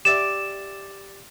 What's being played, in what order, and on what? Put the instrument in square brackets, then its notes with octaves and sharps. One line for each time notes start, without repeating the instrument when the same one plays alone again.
[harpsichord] G4 D5 E5 [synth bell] E7